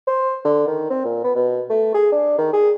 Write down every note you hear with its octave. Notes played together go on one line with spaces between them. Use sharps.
C5
D3
D#3
C4
A#2
B3
B2
A3
G#4
D4
D#3
G#4